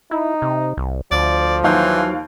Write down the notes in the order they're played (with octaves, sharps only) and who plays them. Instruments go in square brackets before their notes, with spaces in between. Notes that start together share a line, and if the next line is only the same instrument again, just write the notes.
[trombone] D#4 [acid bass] E4
[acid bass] C3
C2
[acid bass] D2 [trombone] F3 [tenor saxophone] D5
[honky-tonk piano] D#2 F5 G6 [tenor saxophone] E3 [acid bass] F#3